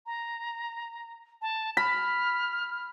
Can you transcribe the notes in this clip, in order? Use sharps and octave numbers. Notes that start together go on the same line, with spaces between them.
A#5
A5
B5 F6